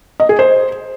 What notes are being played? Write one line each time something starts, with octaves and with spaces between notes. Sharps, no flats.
D#5
G#4
C5